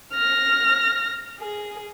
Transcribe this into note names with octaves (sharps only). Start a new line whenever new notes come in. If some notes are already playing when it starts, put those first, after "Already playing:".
F6 A#6
G#4